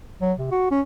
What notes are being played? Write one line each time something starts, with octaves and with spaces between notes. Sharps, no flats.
F#3
C3
F#4
C#4